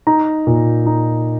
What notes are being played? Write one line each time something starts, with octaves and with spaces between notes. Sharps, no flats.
D#4 A#5
A#2
D#4